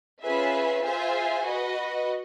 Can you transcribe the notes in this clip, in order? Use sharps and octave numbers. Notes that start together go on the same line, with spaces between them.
C#4 F4 G#4 B4 E5
F4 G#4 C5 E5 G#5
F#4 B4 D#5